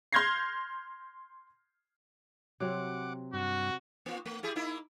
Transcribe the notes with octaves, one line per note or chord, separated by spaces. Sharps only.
C6 F6 G6 G#6 A#6 C7
C3 F#3 C4 F#5 D6
G2 F#4
A#3 F4
A3
E4 G4 G#4
A#3 D#4 E4